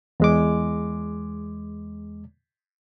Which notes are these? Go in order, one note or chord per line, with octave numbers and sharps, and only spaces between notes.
E2 G#3 D6